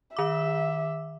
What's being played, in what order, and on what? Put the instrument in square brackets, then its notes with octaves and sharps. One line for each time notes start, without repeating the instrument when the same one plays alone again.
[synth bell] D#3 D6 [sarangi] E5